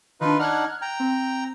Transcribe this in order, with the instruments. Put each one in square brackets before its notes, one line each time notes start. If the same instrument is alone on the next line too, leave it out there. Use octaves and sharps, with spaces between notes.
[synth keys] D#3 D4 [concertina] D#4 F4 B4
[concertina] D4 D#4 F#5 [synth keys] F6 F#6 G#6
[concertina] G5 A#5
[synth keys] C4